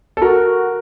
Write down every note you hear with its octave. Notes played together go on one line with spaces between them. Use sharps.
A4
F#4 A#4